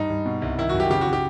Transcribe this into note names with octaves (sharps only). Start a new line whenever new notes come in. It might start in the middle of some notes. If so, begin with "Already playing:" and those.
Already playing: G2 D#4
G2
B2
C2
D#3 E4
F#2 F#4
G4
C#3 G4
F#4
C#3
G4